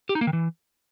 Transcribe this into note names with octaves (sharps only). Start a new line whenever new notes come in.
G4
D#4
A#3
D#3
E3